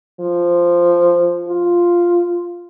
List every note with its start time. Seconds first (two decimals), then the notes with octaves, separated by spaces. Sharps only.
0.20 F3
1.48 F4